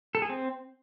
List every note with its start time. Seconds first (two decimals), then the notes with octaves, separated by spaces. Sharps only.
0.15 A4
0.22 G#4
0.29 C4